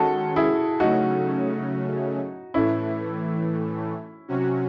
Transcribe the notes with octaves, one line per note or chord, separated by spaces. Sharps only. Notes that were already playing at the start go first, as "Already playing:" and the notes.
Already playing: D#3 G#3 C#4 F#4 A4
E4 G#4
C#3 F#3 A3 C#4 D#4 F#4
A2 E3 A3 C#4 E4
C3 F#3 C#4 F#4